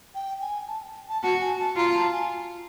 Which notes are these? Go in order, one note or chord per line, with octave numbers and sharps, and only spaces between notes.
G5
G#5
A5
A5
F#4 A5
G#5
A5
F4 A#5
A5
G#5